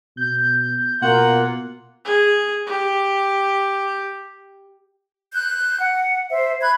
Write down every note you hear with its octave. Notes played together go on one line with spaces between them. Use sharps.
B2 G6
B2 A#3 F4 F#5
G#4
G4
F#6 G6
F#5
C5 E5
B5 F#6 G#6